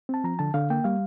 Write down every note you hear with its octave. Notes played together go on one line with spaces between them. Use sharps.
C4 A5
F3 A#5
D3 A5
D3 F5
A#3 G5
G3 F5